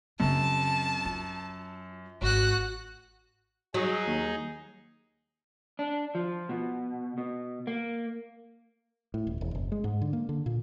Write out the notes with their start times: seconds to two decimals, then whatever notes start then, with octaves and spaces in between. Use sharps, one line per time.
0.20 F#2 C#3 C4 A5
1.05 F4
2.22 G#1 F#4 F#6
3.74 F#3 D#4 G#4
4.07 D#2
5.79 D4
6.15 F3
6.49 B2
7.18 B2
7.67 A#3
9.14 A2
9.27 D#1
9.41 E1
9.55 F#1
9.72 G#3
9.84 G#2
10.01 D3
10.13 A#3
10.29 D3
10.46 A#2